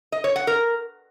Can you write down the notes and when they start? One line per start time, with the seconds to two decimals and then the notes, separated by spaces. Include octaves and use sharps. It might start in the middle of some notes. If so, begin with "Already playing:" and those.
0.12 D#5
0.24 C#5
0.36 F#5
0.47 A#4